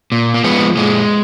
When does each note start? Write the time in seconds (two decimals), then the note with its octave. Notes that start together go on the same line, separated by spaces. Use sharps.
0.12 A#2
0.34 A#3
0.44 F3 G#3 B3
0.77 A#2 G#3